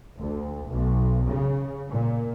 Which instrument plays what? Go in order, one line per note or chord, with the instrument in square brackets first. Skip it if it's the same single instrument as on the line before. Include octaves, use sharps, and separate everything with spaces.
[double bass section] D2
B1
C#3
A#2